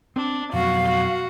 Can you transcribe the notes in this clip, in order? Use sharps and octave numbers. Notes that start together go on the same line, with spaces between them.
C4 D4
F2 B2 F#3 F#4 F5
F#4